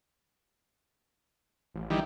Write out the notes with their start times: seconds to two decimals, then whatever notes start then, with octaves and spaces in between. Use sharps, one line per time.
1.74 A1
1.90 D#3 E3 G3